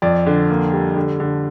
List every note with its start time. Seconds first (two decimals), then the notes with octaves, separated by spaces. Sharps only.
0.02 F2 D5
0.26 D3
0.50 A#3
0.73 G3
0.96 D3
1.20 D3